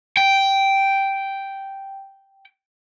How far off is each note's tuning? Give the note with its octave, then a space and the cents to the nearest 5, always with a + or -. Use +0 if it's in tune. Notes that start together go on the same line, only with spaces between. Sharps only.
G5 -5